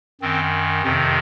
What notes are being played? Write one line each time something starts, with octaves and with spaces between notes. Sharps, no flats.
F#2 D#3 C4
F2 C3 D#3 C4